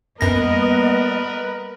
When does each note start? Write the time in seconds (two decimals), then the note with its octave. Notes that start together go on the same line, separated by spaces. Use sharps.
0.21 F#2 G3 A#3 B3 A#4 B4 D#5 A#6